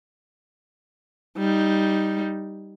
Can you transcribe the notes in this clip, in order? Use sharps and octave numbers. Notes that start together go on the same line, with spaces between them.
G3 D#4